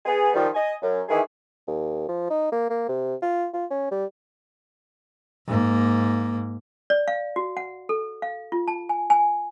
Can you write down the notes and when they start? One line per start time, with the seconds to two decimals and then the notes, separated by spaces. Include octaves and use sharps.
0.05 B3 G#4
0.34 D#3 F3 G3
0.54 D#5 G#5
0.82 F#2
1.09 D#3 E3 G#4
1.67 D#2
2.09 F3
2.30 D#4
2.52 A#3
2.70 A#3
2.89 C3
3.22 F4
3.53 F4
3.71 C#4
3.91 G3
5.47 G#2 A#3
6.90 D5
7.08 F5
7.36 F#4
7.57 F#5
7.89 A4
8.22 F5
8.52 F4
8.68 A5
8.89 G#5
9.10 G#5